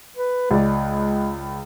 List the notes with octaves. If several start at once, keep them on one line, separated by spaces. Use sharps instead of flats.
B4
C#2 G#3 D5